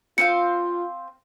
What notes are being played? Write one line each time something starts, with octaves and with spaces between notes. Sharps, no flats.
C4 F4 C5 F5 C#7